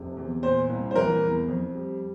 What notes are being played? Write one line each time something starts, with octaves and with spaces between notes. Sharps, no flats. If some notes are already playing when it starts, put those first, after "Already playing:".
Already playing: F1 C3
E2
A#2 C5
C2
C5
E3 A#4
E2
F2
G3